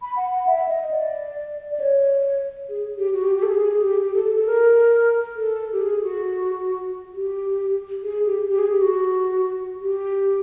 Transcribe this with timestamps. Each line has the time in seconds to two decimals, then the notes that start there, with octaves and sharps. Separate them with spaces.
0.02 B5
0.16 F#5
0.31 F#5
0.47 E5
0.69 D#5
0.91 D5
1.71 D5
1.80 C#5
2.69 G#4
2.98 G4
3.13 F#4
3.24 G4
3.36 G4
3.43 A4
3.47 G#4
3.58 G#4
3.80 G4
4.03 G4
4.14 A4
4.25 A4
4.35 A4
4.46 A#4
5.36 A4
5.73 G4
5.81 G#4
6.03 F#4
7.14 G4
8.03 G#4
8.25 G4
8.48 G4
8.59 G#4
8.70 G4
8.81 F#4
9.81 G4